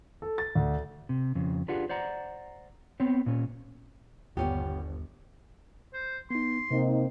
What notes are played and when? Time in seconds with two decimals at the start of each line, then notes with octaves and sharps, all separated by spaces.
0.22 A4
0.38 A6
0.55 D2
1.09 C3
1.35 F2 C#3
1.68 D4 F4 G4 G#4 B4 F#5
1.89 C5 D5 F#5 A#5
3.00 B3 C4 C#5
3.26 A#2 C#4
4.37 G1 D#2 B3 C#4 G4
5.94 C5
6.30 B3 D#4 C6
6.71 C3 A#3 C4 D#4